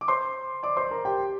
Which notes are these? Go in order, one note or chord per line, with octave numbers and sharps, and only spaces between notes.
D6
C5 C6
D5 D6
C5 C6
A#4 A#5
G4 G5